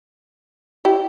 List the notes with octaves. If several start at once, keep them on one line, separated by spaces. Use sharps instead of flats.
E4 G4